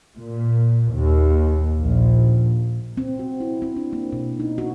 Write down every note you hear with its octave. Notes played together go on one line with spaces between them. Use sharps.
A#2
D#2
A#1
C4
F#4
E4
C4
D4
A#3
B2
D#4
F#4